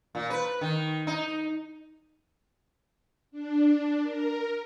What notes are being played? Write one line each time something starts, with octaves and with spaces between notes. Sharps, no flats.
A#2
B4
D#3
D#4
D4
A#4